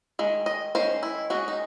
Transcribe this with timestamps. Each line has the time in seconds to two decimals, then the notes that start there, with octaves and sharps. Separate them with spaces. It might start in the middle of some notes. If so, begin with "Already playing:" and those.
0.19 D#3 G#3
0.46 D#5
0.75 D#3 G#3 C#4 C5
1.03 E4
1.30 D#3 G#3 C#4 F#4
1.48 D#4